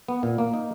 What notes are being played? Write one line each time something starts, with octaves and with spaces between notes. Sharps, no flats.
B3
A#2
A#3
D#4